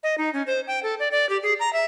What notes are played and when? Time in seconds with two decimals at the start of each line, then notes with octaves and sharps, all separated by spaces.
0.03 D#5
0.18 D#4
0.33 C#4
0.47 C5
0.67 G5
0.83 A4
1.00 D5
1.11 D5
1.29 G4
1.43 G#4
1.60 A#5
1.73 E5